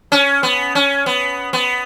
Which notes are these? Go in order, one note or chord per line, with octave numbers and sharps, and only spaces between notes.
C#4
B3
C#4
B3
B3